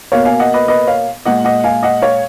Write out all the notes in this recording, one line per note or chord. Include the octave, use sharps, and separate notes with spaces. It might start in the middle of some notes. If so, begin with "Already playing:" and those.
B2 A#3 C#5 F5
F5 G#5
D#5 F#5
B4 D#5
B4 D#5
C#5 F5
A#2 G#3 D#5 F#5
D#5 F#5
F5 G#5
D#5 F#5
C#5 F5